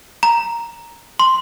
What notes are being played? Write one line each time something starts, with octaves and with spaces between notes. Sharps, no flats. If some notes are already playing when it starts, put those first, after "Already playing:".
A#5
C6